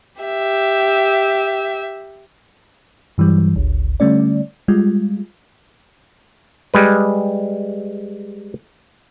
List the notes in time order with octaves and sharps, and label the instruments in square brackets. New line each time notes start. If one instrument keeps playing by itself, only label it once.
[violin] G4 E5
[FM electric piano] G2 E3 F#3 G3
G1 C#2
D3 G3 A3 C#4 D5
G3 G#3 F4
[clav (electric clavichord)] G3 G#3 B4